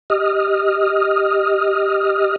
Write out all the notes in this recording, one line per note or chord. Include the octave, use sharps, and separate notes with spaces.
G4 D#5 D#6 F6